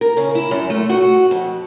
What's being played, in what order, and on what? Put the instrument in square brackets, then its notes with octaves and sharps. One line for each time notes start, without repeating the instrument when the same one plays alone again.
[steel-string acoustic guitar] A#4
C#3
E4
F#2
A3
F#4
F2